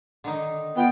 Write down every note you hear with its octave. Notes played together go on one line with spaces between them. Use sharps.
D3 D#3 D#4
B3 F4 G5